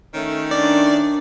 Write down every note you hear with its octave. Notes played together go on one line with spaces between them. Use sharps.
D#3 A3 C#4
D4 D5